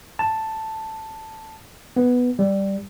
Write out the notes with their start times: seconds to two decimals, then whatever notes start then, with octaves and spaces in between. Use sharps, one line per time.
0.19 A5
1.96 B3
2.39 G3